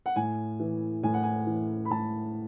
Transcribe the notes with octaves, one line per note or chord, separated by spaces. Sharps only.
F#5
A2 G#5
E3
A2 G#5
F#5
G#5
E3
B5
A2 A5